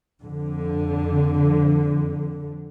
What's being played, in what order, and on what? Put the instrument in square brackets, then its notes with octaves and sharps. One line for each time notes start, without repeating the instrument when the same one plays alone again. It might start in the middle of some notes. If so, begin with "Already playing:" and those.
[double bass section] F2 D3